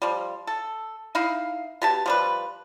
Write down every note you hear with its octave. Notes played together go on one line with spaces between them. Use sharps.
F3 G3
A4
D#4 E4 F5
B2 G4 A5
F3 G3 B4